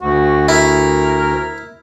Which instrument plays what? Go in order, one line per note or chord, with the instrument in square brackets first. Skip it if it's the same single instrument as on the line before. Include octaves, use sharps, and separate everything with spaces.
[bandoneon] D2 [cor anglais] F#4
[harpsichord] E4 [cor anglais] A#4